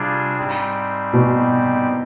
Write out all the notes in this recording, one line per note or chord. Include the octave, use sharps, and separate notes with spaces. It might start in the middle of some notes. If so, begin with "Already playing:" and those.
Already playing: C3 G3 D4 F4 G#4
G#2 G3 C4
B2